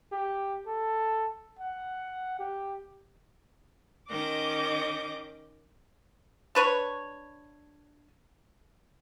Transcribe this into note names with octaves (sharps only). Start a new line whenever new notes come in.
G4
A4
F#5
G4
D#3 C#4 D#5 D6 G6 A#6
D4 B4 C#5